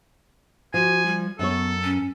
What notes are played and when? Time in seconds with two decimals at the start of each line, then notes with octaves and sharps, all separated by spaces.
0.74 F3 F#4 G#5
1.06 G3
1.39 F#2 B3 A4 C#5
1.84 C#4